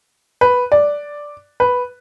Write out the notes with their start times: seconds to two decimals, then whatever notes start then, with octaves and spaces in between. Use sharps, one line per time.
0.41 B4
0.72 D5
1.60 B4